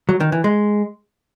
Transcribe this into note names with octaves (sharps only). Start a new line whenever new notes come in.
F#3
D#3
E3
G#3